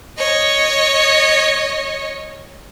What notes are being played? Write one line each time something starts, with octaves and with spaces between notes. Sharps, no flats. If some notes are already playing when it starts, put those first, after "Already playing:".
C#5 D#5